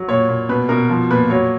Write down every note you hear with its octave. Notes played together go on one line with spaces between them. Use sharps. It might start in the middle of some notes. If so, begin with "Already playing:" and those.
Already playing: F#3
A#2 C#5
A#2
B2 B4
B2 A#4
F3
A#2 B4
F#3 C#5